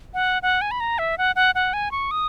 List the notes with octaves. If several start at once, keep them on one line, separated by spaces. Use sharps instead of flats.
F#5
F#5
G#5
B5
A#5
E5
F#5
F#5
F#5
G#5
C#6
D#6